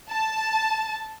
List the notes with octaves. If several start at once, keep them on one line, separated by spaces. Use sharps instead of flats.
A5